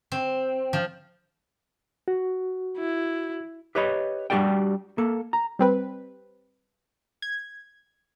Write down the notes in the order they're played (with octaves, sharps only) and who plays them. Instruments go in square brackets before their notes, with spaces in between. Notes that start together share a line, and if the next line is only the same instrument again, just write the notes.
[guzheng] C4
F3
[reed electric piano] F#4
[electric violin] E4
[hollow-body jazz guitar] G4 B4 C#5 D#5 B5
G3 D4 F#4 G4 D5 G5
A#3 A4
A#5
[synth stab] G3 C4 B4
G#6